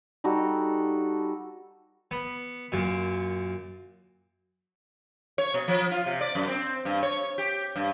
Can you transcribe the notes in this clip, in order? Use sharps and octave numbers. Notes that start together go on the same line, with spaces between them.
G3 D#4 F#4 A4
B3
F#2 A#2
C#5
B2
F3
F4
C3
D5
F#2
C4
G2
C#5
G4
G2